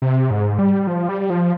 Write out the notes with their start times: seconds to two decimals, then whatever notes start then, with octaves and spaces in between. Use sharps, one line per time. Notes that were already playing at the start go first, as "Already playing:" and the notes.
0.02 C3
0.31 G#2
0.59 G3
0.87 F3
1.09 G3
1.30 F3